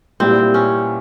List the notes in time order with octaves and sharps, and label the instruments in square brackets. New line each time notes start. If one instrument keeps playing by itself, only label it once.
[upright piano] A#2 G3 B3 E4 G4 [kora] C4
[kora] C#4